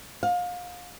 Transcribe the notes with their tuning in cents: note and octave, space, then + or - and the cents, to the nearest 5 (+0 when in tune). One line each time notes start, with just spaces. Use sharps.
F5 +30